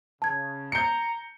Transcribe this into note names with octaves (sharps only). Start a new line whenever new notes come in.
C#3 A5 G#6
A#5 G6 C#7